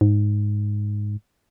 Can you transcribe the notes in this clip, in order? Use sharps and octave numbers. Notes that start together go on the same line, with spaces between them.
G#2